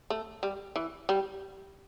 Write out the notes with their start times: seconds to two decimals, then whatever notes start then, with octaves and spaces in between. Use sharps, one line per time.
0.10 A3
0.43 G3
0.76 E3
1.09 G3